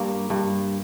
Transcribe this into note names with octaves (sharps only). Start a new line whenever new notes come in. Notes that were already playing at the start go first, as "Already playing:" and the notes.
Already playing: G2 A#3
G2